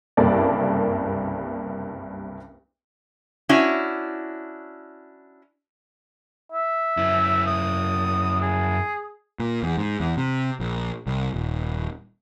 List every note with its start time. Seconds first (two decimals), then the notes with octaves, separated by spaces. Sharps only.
0.17 F#1 C2 G2 A#3 A4 D5
3.49 C#4 D4 E4 F#4
6.52 E5
6.97 F#2 E4
7.47 D#6
8.41 G#4
9.40 A#2
9.63 E2
9.78 G#2
10.00 E2
10.17 C3
10.60 A#1
11.07 C2
11.34 D#1